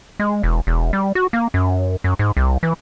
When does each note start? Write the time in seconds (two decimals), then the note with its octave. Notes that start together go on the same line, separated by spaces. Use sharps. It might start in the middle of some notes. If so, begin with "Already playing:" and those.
0.20 G#3
0.43 E1
0.67 E1
0.93 G3
1.15 F#4
1.33 A#3
1.54 F#2
2.04 F#2
2.19 G#2
2.37 C2
2.63 E3